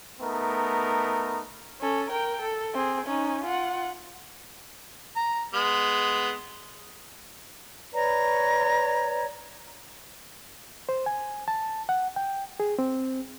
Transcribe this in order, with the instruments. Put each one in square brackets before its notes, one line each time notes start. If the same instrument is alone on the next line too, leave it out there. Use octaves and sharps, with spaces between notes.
[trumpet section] A3 B3 D#4 A#4
[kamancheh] C#4 A4
A#4 G5
A4
C4 G#4
C#4 D#4
F4 F#5
[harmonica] A#5
G#3 B3
[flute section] B4 C#5 D5 A#5
[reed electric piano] C5
G#5
A5
F#5
G5
G#4
C4